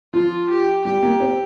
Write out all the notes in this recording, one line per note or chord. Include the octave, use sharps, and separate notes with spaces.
F3 F4
G4
G3 G4
A#3
C4